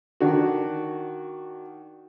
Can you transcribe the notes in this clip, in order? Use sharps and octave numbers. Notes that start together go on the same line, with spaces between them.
D#3 D4 F#4